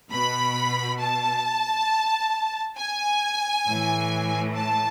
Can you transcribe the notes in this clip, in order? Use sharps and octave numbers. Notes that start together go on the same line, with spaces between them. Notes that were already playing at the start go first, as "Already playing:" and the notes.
B2 B5
A5
G#5
A2 E3
A5